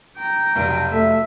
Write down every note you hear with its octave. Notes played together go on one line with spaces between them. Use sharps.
G5 A#5
F1 B1
A3 E5